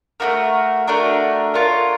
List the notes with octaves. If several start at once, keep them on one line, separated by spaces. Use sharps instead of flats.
A3 D4 F#4 A#4
A3 D4 F#4 A#4
F4 A#4 C#5 F#5